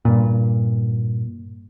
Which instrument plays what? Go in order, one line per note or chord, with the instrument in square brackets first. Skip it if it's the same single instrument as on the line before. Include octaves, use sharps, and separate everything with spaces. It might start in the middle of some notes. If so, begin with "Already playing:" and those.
[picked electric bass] G2 A#2